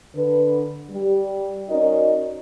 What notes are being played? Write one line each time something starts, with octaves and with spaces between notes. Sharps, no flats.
D3 B4
G3
C#4 D#4 F#4 A#4 D5 D#5